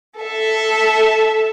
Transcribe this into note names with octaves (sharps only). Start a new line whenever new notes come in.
A4 E5